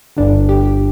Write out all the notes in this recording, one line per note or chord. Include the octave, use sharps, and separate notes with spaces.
G1 G2 D3 D4
G4